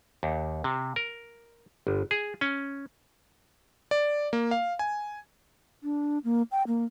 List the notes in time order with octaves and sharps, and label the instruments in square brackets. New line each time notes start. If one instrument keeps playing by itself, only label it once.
[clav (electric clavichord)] D#2
C3
A#4
G1
G#4
C#4
[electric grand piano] D5
A#3
F5
G#5
[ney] D4
A#3
G5
A#3